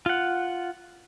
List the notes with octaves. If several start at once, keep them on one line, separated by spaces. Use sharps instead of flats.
F4 F#5